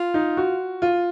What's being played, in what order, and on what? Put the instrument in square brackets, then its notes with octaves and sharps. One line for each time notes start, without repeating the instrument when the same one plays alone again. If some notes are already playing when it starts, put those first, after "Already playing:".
Already playing: [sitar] F4
[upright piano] D#4
F#4
F4